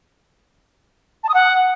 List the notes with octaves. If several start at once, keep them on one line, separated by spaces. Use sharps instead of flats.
A5
D#6
F#5